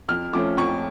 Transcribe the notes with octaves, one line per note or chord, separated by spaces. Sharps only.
F2 F6
F3 A3 C#4 D6
F2 C#6